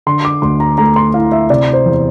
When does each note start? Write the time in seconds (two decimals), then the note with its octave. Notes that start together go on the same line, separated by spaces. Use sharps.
0.06 D3 C6
0.25 D6
0.42 D2 C6
0.60 A#5
0.78 A3 A#5
0.96 C6
1.14 E4 F5
1.32 E5
1.50 C3 D5
1.73 C5
1.85 E2